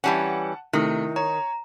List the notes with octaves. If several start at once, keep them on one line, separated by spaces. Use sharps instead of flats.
E3 G3 C#4 F#5 A5
C3 D#3 A3 E4
C#5 A#5